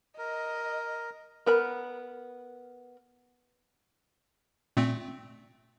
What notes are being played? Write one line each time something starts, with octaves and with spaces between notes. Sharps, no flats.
A#4 D#5
B3 A#4 B5
A#2 A3 C4